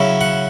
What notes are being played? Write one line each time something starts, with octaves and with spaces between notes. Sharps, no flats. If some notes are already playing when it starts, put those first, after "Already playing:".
Already playing: C#3 F#3 C#4 E4
F#5